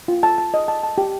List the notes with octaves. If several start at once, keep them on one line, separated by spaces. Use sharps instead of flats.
F4
A5
A5
D#5
A5
A5
G4